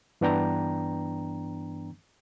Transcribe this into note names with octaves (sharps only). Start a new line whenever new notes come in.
G2 E3 B3 D4 G5 A#5